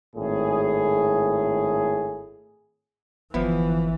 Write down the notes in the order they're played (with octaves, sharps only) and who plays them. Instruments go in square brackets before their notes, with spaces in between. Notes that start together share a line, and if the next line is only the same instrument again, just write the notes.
[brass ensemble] G#1 A2 G#4
[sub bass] G1 [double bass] E3 [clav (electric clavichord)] F3 E4 [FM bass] B3